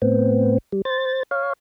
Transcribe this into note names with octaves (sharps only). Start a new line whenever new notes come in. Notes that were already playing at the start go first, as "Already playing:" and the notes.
A2 B3 C4
G3
C5 A6
C#5 F5